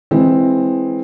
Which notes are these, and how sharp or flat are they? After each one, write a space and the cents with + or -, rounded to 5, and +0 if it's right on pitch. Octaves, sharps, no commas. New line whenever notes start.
E3 +0 G#3 +0 C4 +10